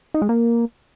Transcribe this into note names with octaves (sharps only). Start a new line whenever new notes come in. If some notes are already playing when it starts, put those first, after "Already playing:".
D#4
G#3
A#3